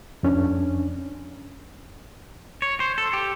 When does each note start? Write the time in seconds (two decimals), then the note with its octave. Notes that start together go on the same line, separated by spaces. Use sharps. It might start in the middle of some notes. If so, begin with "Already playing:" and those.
0.23 F2 C#4 D4
2.62 C#5
2.80 C5
2.98 A4
3.13 G4